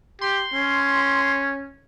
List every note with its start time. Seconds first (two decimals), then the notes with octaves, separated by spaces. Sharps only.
0.21 G4 C6
0.54 C#4